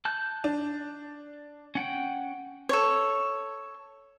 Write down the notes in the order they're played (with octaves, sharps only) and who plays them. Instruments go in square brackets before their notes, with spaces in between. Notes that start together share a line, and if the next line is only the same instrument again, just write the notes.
[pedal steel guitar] A5 F#6 G6
[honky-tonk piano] D4
[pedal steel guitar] C#4 F#5 G5
[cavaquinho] A4 C#5